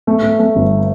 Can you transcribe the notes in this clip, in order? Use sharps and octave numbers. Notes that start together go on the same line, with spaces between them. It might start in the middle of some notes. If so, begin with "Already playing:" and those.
A3
A3
A3
G1